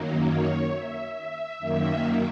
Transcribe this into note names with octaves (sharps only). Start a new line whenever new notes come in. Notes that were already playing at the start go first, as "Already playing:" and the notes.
Already playing: F#2 D#3 F#3 A#3
C#5
E5
E5
F#2 D#3 A#3 E5